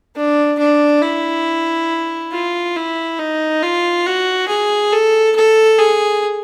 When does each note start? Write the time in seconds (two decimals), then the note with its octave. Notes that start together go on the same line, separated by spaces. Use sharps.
0.16 D4
0.59 D4
1.02 E4
2.32 F4
2.76 E4
3.19 D#4
3.63 F4
4.06 F#4
4.48 G#4
4.92 A4
5.36 A4
5.79 G#4